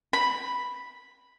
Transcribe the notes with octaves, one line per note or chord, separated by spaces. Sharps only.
B5